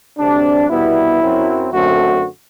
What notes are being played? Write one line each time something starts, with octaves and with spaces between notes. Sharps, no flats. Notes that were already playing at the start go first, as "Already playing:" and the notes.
D2 C3 G3 C4 D4
C2 B2 G3 B3 E4
F#2 F#3 C4
F#2 D3 A3 C4 F#4